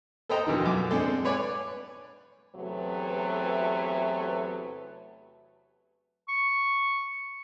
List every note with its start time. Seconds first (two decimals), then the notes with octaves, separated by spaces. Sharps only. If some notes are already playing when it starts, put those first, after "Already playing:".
0.29 A4 B4 C5 D#5 G5 A#5
0.47 F2 B2 D3 D#3
0.65 F#2 D6
0.91 G#3 C4 D4 A4
1.25 B4 C#5 D5 G#5
2.55 E2 C3 F#3 A3 B4
6.29 C#6